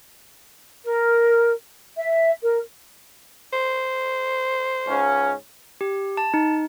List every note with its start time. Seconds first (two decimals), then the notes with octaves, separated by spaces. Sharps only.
0.85 A#4
1.97 E5
2.42 A#4
3.53 C5
4.87 C#2 G#2 C#4
5.81 G4
6.17 A5
6.34 D#4